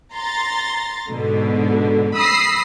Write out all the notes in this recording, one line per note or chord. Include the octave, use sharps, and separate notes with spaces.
A#5 C6 A6
G#2 B2 D3
B5 D#6 E6 A#6 C7